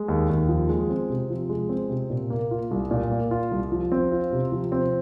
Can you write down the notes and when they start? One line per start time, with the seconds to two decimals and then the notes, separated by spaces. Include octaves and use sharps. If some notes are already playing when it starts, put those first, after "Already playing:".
Already playing: G#3
0.08 D#2
0.29 D#2
0.48 F3
0.69 G#3
0.90 C4
1.10 C3
1.30 F3
1.49 G#3
1.69 C4
1.89 C3
2.10 A#2
2.30 A#3
2.51 F4
2.71 C2
2.91 A#2
3.11 A#3
3.31 F4
3.51 C2
3.72 F3
3.92 C4
4.12 F4
4.32 C3
4.52 F3
4.72 C4